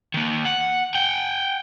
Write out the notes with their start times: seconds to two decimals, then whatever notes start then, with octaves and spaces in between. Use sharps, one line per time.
0.14 D#3 A#3
0.45 F#5
0.95 F#5 G5